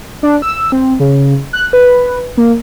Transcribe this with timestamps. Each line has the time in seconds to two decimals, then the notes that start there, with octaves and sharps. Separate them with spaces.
0.23 D4
0.42 E6
0.72 C4
1.00 C#3
1.53 F#6
1.73 B4
2.37 A#3